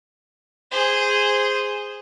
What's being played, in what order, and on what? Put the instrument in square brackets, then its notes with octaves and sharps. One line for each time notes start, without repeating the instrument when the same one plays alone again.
[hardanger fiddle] G#4 C5